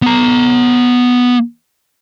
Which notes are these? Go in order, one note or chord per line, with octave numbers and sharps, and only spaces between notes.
B3 A#5